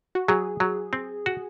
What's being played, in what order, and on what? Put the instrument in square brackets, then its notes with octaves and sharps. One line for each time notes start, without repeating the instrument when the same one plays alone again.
[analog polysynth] F#4
[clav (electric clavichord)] F#3 [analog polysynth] G#4
[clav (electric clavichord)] F#3
C4
F#4